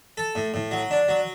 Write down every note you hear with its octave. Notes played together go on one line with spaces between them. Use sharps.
A4
A2
A2
F#3
D4
F#3